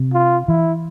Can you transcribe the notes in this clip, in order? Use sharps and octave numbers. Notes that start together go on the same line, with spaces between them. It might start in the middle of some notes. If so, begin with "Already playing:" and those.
Already playing: C3
F4
E3 E4